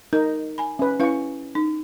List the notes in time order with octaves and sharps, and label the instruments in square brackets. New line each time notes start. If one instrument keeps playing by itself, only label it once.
[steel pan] D#4 [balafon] A#4
[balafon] G#5 B5
[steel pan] C#4 B4
[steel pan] C#4 C#6 [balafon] E4 B4 F5
[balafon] D#4